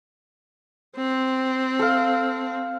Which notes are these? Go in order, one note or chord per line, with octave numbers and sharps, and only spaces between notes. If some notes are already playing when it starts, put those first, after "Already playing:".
C4
A4 F5